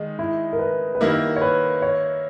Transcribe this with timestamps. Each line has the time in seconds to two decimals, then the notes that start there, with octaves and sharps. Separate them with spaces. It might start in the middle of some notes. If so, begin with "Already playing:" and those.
Already playing: D#3 G#3 D#4
0.19 E4
0.53 A#4
0.59 B4
0.95 B4
1.00 D#3 G3 A#3 E4 A#4
1.36 C#5
1.41 B4
1.82 C#5